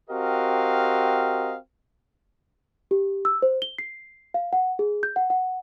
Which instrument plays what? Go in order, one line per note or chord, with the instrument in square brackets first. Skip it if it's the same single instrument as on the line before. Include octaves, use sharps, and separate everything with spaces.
[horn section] C4 F#4 G4 A#4 D#5 F5
[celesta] G4
E6
C5
G7
C7
F5
F#5
G#4
G6
F#5
F#5